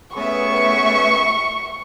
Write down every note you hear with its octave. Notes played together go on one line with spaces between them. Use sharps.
A3 B3 C#4 G#4 E5 C#6